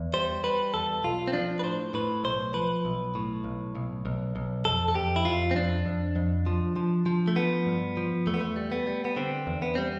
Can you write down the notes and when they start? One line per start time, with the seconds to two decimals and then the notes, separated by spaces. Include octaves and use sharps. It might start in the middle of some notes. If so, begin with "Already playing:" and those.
Already playing: E2
0.13 G3 C5
0.44 G3 B4
0.74 E2 A4
1.03 B1 F4
1.28 C4
1.33 F3 D4
1.59 B4
1.63 A2 C5
1.94 A2 B4
2.24 B1 C5
2.54 F3 B4
2.85 B1
3.15 A2
3.44 B1
3.75 B1
4.06 B1
4.36 B1
4.65 F2 A4
4.88 A4
4.95 F2 G4
5.16 E4
5.25 F2 F4
5.51 C4
5.55 F2 D4
5.86 F2
6.16 F2
6.46 F3
6.76 F3
7.06 F3
7.28 A3
7.36 F3 B3
7.66 G2
7.97 F3
8.27 E2 A3
8.34 B3
8.41 A3
8.56 G3
8.72 B3
8.87 G3
9.05 B3
9.16 D3 C4
9.47 E2
9.62 B3
9.75 G3 C4